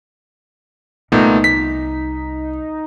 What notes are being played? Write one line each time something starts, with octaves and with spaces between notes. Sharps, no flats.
C2 A#2 A3 B3 D#4
B6